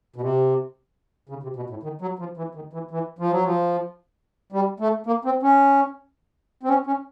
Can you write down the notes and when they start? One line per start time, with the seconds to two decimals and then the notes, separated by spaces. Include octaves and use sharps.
0.16 B2
0.21 C3
1.29 C#3
1.43 C3
1.56 B2
1.70 A2
1.83 D#3
2.01 F#3
2.19 F3
2.37 E3
2.55 D#3
2.73 E3
2.91 E3
3.19 F3
3.31 F#3
3.44 F3
4.52 G3
4.80 A3
5.06 A#3
5.25 C4
5.43 C#4
6.63 C4
6.69 C#4
6.87 C#4